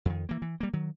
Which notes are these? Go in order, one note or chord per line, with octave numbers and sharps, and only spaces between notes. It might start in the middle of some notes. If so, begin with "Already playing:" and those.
F2 D#3
E3 A#3
E3
G3 A#3
D#3 F#3